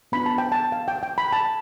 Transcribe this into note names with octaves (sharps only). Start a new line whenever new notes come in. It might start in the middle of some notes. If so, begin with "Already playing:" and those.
B3 D4 F4 B5
A5
G5
A5
F5
G5
G5
B5
A5